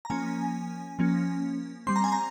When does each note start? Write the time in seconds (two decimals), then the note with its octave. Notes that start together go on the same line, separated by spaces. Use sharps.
0.05 A#5
0.10 F3 A#3 C#4 G#5
0.99 F3 A#3 C#4
1.87 G3 C4 C6
1.96 A#5
2.04 G#5
2.12 A#5